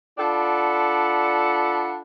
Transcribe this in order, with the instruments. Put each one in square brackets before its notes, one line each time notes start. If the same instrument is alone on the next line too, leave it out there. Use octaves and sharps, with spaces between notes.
[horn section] D4 F4 A4 D5 F#5 B5